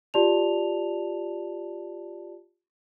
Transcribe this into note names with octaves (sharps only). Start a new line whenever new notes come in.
F4 G4 D5 A5 F7